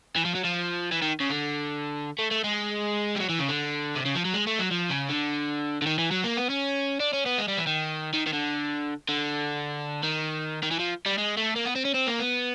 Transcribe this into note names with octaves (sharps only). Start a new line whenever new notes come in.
E3
F3
F#3
F3
E3
D#3
C#3
D3
A3
A3
G#3
G3
F#3
E3
C#3
D3
C3
C#3
F3
F#3
G#3
A3
F#3
F3
C#3
D3
D3
D#3
E3
F#3
A#3
B3
C#4
D4
C#4
B3
G#3
G3
E3
D#3
D#3
D#3
D3
D3
D#3
D#3
E3
F3
G3
G#3
A3
A#3
B3
C4
C#4
C4
A#3
B3